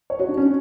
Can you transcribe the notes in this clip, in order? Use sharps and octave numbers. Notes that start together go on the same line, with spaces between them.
C#5
F#4
D4
C#4